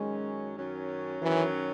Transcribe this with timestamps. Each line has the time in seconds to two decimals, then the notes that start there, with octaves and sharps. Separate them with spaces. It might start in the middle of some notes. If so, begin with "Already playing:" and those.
Already playing: F#2 D#3 F#3 G#3 C#4
0.57 F#2 D#3 F#3 C#4
1.21 F#2 D#3 E3 F#3 C#4